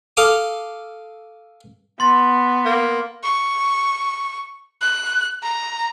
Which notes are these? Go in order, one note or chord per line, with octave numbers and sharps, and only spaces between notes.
A4 F5 D6 D#6
B3 C6 A6
A#3
C#6
F#6
A#5